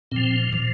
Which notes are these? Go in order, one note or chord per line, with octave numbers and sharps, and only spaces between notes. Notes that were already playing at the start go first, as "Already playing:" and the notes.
A#2 F3 C4
A#2 F3